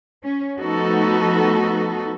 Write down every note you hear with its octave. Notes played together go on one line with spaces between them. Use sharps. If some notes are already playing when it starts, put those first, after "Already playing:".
C#4
F3 A3 B3 D#4 F#4 A4